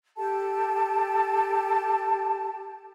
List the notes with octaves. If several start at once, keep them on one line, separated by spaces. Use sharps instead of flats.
G4 A4 G5 A5